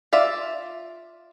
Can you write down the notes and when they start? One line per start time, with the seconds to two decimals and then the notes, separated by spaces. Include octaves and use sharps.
0.13 F4 D5 E5